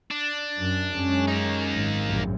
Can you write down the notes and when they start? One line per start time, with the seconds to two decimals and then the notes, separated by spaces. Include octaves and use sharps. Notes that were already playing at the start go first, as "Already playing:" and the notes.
0.11 D4
0.59 F#2
0.95 F#2 G#3 C#4
1.28 A#3 D#4
1.74 G#1
2.05 A#1 F#2 A2